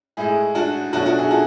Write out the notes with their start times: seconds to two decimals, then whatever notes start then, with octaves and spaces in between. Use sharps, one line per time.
0.17 A2 G#3 E4 G#4
0.55 D4 F#4
0.93 B2 F#3 A3 D4 F#4
1.06 D4 F#4
1.18 E4 G#4
1.31 F#4 A4